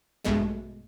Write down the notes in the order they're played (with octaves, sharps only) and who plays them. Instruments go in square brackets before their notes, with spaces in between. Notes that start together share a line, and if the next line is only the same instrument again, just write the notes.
[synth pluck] A#1 G2 B2 G#3 A3